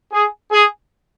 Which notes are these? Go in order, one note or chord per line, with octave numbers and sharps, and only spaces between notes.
G#4
G#4